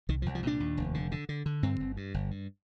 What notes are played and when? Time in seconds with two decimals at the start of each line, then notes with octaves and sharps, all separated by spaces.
0.09 C2 D#3
0.22 F3
0.26 C2
0.35 F3
0.43 A#2 D4
0.60 D#2
0.77 F1
0.94 D3
1.12 D3
1.29 D3
1.46 D3
1.63 G2 C4
1.80 G1
1.97 G2
2.14 G1
2.31 G2